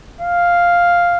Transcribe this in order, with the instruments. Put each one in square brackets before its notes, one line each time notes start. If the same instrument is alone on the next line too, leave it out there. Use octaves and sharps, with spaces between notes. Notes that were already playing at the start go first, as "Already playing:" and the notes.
[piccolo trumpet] F5